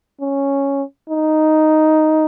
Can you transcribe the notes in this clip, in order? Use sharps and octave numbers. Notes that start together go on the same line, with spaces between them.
C#4
D#4